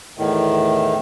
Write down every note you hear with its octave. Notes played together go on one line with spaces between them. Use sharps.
E2 A2 D#3